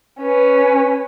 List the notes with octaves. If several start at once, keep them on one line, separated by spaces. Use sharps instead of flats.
C#4 B4